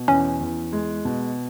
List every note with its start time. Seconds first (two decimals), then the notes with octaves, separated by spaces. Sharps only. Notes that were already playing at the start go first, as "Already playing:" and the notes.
Already playing: B2
0.08 E2 C#4
0.41 E2
0.73 G#3
1.05 B2